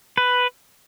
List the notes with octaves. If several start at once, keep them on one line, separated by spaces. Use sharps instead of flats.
B4